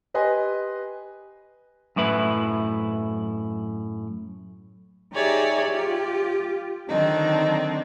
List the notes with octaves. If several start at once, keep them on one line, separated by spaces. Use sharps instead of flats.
G4 B4 D#5 G#5 C6
F#2 A2 E4 B4
D#4 G4 G#4 C#5 D5 E5
F4 G4
D3 D#3 F#3 C4 D4 D#4